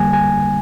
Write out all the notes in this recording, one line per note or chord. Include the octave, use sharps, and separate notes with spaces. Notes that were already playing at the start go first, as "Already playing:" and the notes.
Already playing: F2 D3 G3 A#3 G#5
G#5